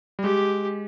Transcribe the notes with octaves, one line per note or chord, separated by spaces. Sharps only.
G3
G#3 G4